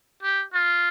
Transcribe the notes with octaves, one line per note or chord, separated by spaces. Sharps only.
G4
F4